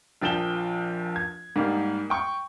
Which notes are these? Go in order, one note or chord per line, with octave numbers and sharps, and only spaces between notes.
A#1 F3 G5 E7 G7
G#6
G#2 G3 A#3
G5 C#6